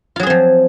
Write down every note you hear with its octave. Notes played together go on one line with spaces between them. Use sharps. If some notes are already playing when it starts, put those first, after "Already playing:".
F3 F#3 C4 F4 G#4